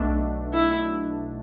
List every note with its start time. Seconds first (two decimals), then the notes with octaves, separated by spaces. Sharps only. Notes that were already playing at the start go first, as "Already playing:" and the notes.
Already playing: B1 B2 A3 D4
0.53 E4